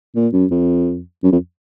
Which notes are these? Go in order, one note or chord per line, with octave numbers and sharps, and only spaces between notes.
A#2
F#2
F2
F#2
F2